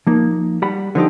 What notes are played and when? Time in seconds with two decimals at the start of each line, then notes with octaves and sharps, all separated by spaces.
0.06 F3 A#3 D#4
0.62 G3 F#5 B5
0.95 D3 F3 D#4 G4